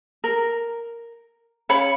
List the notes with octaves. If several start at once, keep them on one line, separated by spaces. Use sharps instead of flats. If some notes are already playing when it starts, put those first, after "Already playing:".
A#4
C#4 C#5 F5 B5